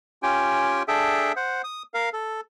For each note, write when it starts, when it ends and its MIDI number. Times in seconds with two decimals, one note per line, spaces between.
0.23 0.83 61
0.23 0.83 65
0.23 0.83 67
0.23 0.83 79
0.23 0.83 80
0.88 1.32 62
0.88 1.32 68
0.88 1.32 69
0.88 1.32 76
0.88 1.32 79
1.36 1.62 72
1.36 1.62 78
1.64 1.83 87
1.94 2.09 70
1.94 2.09 77
2.13 2.41 69